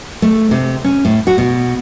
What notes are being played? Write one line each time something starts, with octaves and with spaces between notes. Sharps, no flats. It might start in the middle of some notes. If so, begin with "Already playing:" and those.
A3
C3
C#4
A2
F#4
B2